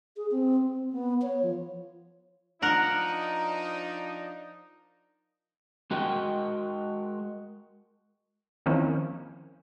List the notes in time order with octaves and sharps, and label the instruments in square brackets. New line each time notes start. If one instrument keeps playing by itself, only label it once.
[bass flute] G#4
C4
C4
B3
C#5
F3
[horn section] F3 D4 D#4 [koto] A#4 F#5
[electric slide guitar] G#3 F#4 A#4 D#5 G5
[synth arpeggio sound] D#3 F3 A#3 C4 C#4 E4